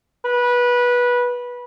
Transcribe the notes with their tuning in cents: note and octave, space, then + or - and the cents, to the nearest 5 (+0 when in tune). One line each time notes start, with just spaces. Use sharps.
B4 -20